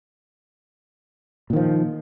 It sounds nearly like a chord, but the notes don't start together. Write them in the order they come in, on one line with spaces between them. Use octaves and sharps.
A#2 D#3 F3